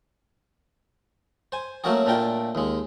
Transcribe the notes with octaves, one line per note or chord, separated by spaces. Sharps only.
C5 G#5
F#3 A3 A#3 C#4 F#4 G#4
A#2 A3 D4 A#4 G5
D#2 G#3